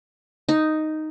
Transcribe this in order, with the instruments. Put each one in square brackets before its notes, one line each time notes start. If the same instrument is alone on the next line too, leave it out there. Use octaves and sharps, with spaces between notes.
[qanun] D#4